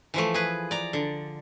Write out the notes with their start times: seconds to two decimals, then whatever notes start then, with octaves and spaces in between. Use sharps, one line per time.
0.14 E3 F3 A3
0.34 G#4 B4
0.71 D5 A#5
0.93 D3